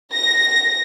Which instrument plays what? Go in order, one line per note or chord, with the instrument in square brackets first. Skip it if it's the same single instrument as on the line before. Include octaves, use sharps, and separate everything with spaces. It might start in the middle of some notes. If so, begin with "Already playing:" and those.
[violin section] A#6